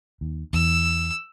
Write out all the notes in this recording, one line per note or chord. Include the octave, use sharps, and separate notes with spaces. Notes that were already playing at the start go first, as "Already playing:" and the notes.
D#2
E2 E6